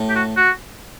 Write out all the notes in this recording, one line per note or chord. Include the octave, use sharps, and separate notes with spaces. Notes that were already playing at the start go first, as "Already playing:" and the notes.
Already playing: A2
G4
F#4
F#4